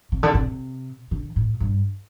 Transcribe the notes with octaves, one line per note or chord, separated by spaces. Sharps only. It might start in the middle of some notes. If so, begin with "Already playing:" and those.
C3
D3
C3
D3
A2
G2